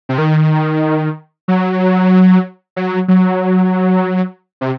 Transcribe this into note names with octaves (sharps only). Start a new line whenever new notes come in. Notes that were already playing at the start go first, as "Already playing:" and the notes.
C3
D#3
F#3
F#3
F#3
C3